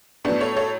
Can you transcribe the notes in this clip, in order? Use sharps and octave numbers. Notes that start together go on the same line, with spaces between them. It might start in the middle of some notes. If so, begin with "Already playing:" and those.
A2 F#3 B3 D4
A4 C#5
A4 C#5